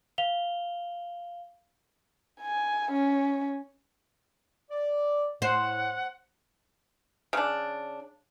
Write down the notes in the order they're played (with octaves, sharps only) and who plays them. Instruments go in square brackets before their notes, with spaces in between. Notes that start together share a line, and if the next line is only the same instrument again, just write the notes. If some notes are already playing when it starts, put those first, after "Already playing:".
[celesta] F5 F7 G7
[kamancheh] G#5
C#4
[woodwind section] D5
[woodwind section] A2 [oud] C5 [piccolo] F#5
[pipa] C#3 D4